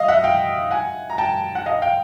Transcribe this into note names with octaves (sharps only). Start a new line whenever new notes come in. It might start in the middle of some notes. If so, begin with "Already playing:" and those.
Already playing: D#5 F5
E5 F#5
F5 G5
F#5 G#5
A#5
G5 A5
F#5
D#5 F5
F5 G5